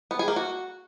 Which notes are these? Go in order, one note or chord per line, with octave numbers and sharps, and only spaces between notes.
B3
G#4
A#3
F#4